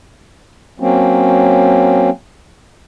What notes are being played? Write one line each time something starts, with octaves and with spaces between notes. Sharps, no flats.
F#3 A#3 C4 C#4